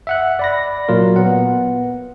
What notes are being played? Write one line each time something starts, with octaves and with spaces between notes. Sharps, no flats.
E5 F#5 F#6
D5 B5 A#6
A#2 F#3 F4 A#4
B3 F#5